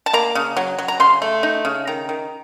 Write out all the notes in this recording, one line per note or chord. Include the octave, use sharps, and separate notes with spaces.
A5
A#3 A#5
C#3
F#3
F#3
A#5
C#3 C6
A3
D#4
C#3
D#3 A#5
D#3